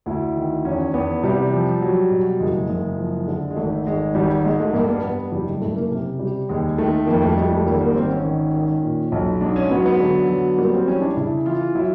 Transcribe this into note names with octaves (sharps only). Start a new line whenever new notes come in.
D2 E4
D#3
E2 C#4
E2 B3
C3 G3
F3
F#3
B2
F#1 G#3
F#1
F3
D3
G#3
G#1 A3
G#1 G#3
G#1 G3
G#2 G#3
A3
G2 A#3
B3
G2 B3
F#1 G3
G#3
C#3 A3
A#3
C3
G3
D#2 G#3
D#3 A3
F2 A#3
A3
G3 G#3
A3
G#1 A#3
A#3
G#1 C4
C#4
D#3
D#3
A#2
B1
G#2 D4
C#4
F#3 B3
B3
D3
F#3
G3 A#3
C4
E3 C#4
D4
C#3 E4
E3 F4
F#3 E4